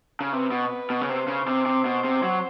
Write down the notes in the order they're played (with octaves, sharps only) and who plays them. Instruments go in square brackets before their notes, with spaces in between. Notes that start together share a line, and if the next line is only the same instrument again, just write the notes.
[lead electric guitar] C#3
[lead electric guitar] C3 [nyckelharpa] B4
[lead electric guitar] B2
B2
C#3
[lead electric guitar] C3 [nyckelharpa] C5
[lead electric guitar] C#3
C3
C3
B2
C3
F#3